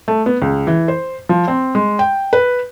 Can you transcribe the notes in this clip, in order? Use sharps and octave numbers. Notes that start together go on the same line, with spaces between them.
A3
B3
C#2
E3
C5
F3
C4
G#3
G5
B4